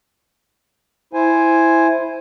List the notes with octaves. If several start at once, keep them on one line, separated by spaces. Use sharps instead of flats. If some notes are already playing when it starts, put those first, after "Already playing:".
E4 C5 G#5